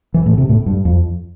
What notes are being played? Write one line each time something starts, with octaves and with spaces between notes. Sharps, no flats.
E3
A2
C3
A2
G2
F2